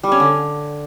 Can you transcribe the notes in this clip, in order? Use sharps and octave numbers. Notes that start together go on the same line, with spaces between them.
G3
C#4
D3